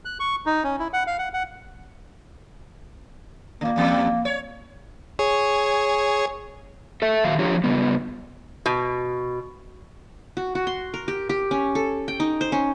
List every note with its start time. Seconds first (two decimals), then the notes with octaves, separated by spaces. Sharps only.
0.05 F#6
0.20 C#6
0.46 D#4
0.64 C#4
0.79 E4
0.93 F#5
1.07 F5
1.19 F#5
1.34 F#5
3.61 A#2 D3 A#3
3.76 E2 G3
4.25 C#5
5.19 G#4 C#5
7.02 A4 E5
7.24 A#2 D#3 F#3 F5
7.39 F3 D4 F4 G4 C#5 A#5
7.64 C#3 G3 B3
8.66 B2
10.37 F#4
10.55 F#4
10.67 C6
10.94 A#4
11.08 G4
11.29 G4
11.51 C#4
11.75 A4
12.08 G5
12.20 D#4
12.41 C5
12.52 C#4